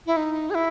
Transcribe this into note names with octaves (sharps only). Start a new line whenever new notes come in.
E4
D#4
G#4
E4